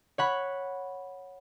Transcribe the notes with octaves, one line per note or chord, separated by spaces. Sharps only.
C#5 F#5 B5